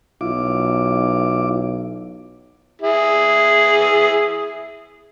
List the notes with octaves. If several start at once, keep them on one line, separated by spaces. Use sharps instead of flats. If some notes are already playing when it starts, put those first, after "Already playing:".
B1 E4 F4 D6
E4 G#4